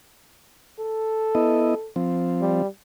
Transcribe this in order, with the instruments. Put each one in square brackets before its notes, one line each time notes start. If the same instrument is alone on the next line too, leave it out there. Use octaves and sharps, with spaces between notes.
[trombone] A4
[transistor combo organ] B3 E4 D#5
F3 C4
[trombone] G3